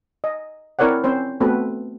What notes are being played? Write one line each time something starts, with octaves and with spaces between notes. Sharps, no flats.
D#5
C4 E4 A#4 C#5 D5 F#5
C4 C#4 C5
A3 B3 C4 F#4 A4 B4